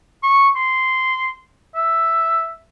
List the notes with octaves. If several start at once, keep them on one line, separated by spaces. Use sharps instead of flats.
C#6
C6
E5